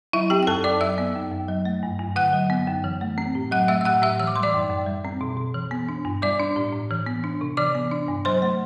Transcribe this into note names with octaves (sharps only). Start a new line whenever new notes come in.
F#3 E4 E5
C4 G4 G5
G5
F#2 A4 A5
F#2 D5 D6
F#3 E5 E6
B3
F#2
F#2
F#3
A3
G2
G2
D3 F#5 F#6
F#3
B3
F#2
E3
A3
C4
A2
F#3 F#5 F#6
A3 E5 E6
E6
A2 F#5 F#6
A2 E5 E6
E3 E6
D6
G3 C6
D5 D6
F#2
F#2
G3
C4
B2
B2
E3
B3
D4
G2
G3 D5 D6
D4
A2
A2
E3
B3
D4
C3
E3 D5 D6
B3
D4
G2
F#3 C5 C6
A3